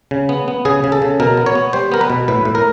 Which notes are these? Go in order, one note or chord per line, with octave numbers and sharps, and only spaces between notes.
C#3
B3
B3
C#3 G#4
C#3
A4
C#3
B2 A#4
B3
C#5
B3
G3 C5
B3 A#4
B4
B2
A2 B4
A2
A#4